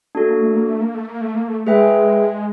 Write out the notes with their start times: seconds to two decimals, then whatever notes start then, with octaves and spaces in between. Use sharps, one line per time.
0.15 A3 D4 F#4 A4
0.28 A#3
0.41 A3
0.55 A#3
0.68 A3
0.81 A#3
0.94 A3
1.08 A#3
1.21 A3
1.35 A#3
1.48 A3
1.66 G#3 G#4 B4 E5 G5